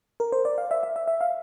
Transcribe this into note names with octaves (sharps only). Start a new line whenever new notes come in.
A#4
C5
D5
F5
E5
E5
E5
E5
F5